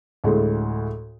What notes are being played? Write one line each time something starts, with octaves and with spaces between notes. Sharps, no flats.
D2 A2 G#3